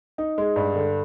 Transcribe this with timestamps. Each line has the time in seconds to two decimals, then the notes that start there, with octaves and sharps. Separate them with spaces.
0.18 D#4
0.38 G#3
0.56 G2
0.75 D3